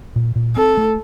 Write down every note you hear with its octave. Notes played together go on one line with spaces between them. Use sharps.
A#2
A#2
C4 A4
A3